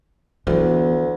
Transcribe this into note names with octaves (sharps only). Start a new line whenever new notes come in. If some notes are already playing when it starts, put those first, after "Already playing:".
D2 E3 B3